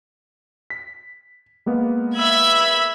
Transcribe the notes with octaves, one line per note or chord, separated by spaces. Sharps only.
B6
G#3 A#3 B3
E5 B5 G#6